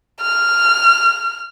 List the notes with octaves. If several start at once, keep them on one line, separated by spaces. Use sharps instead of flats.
F6